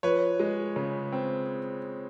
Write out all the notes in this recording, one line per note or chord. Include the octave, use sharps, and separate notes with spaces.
F3 B4 C#5
G#3
C#3
C4